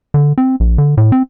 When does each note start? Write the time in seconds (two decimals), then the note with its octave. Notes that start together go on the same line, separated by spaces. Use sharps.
0.14 D3
0.38 C4
0.60 A#1
0.78 D3
0.97 A2
1.12 C4